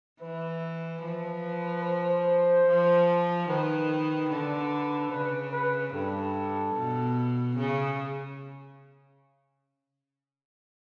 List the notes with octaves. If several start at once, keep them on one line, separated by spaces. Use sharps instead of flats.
E3 B4
F3
C5
F3
D#3 B4
D3
C#3 B4
B4
G2 A4
B2
C#3 G#4